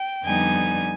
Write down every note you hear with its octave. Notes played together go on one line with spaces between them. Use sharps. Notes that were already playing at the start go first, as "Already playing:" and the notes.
Already playing: G5
F2 D3 G3 B3 D#4 G#5